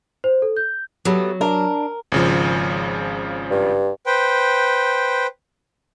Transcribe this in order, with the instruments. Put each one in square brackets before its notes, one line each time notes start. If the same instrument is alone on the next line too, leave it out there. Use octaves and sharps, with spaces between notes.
[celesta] C5
A4
G6
[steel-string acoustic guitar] F#3 [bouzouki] G3 A3 B3
[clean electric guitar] D4 [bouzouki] A#4
[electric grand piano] G#1 C#3 F3
[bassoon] G2
[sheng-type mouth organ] B4 C5 G5